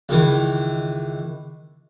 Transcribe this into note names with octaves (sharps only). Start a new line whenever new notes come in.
C#2 D#3 E3